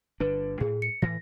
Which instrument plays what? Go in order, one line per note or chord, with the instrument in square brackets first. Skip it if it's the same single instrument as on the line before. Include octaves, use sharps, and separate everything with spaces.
[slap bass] G1 D3 D4 [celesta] B4
[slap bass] A2 [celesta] G#4
[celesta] C#7
[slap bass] A2 E3 [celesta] A#6